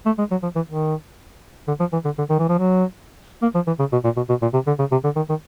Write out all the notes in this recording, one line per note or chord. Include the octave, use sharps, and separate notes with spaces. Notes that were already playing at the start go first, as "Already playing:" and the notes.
A3
G#3
F#3
F3
E3
D#3
D3
F3
E3
D3
D3
D#3
E3
F3
F#3
A#3
F3
E3
C#3
B2
A#2
B2
B2
A#2
C3
D3
C#3
C3
D3
D#3
D#3